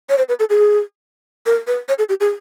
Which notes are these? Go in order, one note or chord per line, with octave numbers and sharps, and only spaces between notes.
C#5
C5
B4
A4
G#4
A#4
B4
C#5
A4
G4
G#4